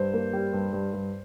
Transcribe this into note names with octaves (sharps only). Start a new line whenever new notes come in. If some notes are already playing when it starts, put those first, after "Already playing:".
Already playing: G2 C5
A#3
G3
G2
G2
G2